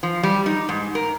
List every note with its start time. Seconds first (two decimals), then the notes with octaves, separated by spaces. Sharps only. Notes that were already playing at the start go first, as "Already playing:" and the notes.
0.03 F3
0.23 G3
0.46 D#4
0.69 G#2
0.95 A#4